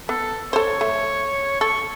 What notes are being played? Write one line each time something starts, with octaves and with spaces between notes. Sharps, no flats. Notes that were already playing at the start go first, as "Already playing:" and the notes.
B3 A4
A4 C5 C#5
A3
A4 C#6